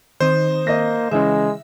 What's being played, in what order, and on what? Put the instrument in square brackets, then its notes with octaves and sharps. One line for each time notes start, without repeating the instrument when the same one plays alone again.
[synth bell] D#3 C4 D#6 [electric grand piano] C5
[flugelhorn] A#3 [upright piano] D#5 A#6
[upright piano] C#3 E3 [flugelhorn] G#3 [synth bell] E5